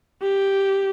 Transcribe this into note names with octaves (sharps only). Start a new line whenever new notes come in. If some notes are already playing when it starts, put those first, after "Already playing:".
G4